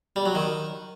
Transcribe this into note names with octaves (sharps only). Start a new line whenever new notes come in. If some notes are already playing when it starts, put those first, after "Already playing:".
G3
F#3
D#3